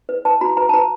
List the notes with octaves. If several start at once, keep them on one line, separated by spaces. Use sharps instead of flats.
B4
B4 A5
F#4 A#5
B4 A#5
A5
B4 A#5